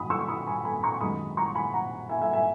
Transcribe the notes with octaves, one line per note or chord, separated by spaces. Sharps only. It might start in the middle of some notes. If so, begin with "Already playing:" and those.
Already playing: F#2 D#3 F#3 C#4 B5 D#6
C#6 E6
B5 D#6
G#5 B5
G#5 B5
A#5 C#6
F#2 D#3 G#3 B3 B5 D#6
A#5 C#6
G#5 B5
F#5 A#5
E5 G#5
E5 G#5
E5 G#5